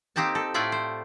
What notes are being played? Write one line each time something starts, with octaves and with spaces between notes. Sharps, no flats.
A#3 C4 D#4 G4 G5 A5
A4
A2 A3 E4 F4 D5 E5
C5